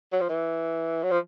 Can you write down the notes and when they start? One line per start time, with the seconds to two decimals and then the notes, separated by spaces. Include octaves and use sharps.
0.13 F#3
0.21 F3
0.29 E3
1.03 F#3
1.11 F3